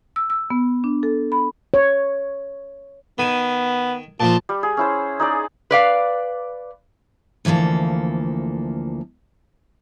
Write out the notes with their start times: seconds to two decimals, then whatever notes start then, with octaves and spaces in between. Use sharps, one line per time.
0.16 E6
0.30 E6
0.50 B3
0.84 D4
1.03 A4
1.32 B5
1.74 C#5
3.18 D#3 B3 G#5
4.20 A#2 F3 F4 A5
4.49 G3
4.63 G#4
4.77 C#4 E4 C5
5.19 D#4 G#4 D5
5.71 B4 D5 F5
7.45 D2 E3 F3 A#3 A4